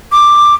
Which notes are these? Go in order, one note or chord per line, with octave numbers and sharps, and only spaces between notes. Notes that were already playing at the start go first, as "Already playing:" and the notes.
D6